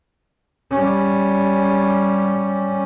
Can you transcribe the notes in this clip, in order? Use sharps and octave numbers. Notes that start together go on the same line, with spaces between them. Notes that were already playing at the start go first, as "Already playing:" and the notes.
G3 C#4